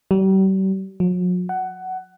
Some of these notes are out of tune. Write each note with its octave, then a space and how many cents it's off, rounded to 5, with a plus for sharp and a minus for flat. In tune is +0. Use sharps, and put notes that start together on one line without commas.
G3 -40
F#3 -45
F#5 +15